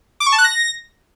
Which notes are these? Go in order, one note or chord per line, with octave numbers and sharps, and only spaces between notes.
D6
C#6
A5
F#6
A#6